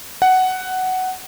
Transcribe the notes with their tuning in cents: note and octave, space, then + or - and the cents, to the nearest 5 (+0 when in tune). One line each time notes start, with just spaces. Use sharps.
F#5 +10